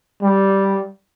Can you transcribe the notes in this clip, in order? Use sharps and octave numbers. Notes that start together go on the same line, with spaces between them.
G3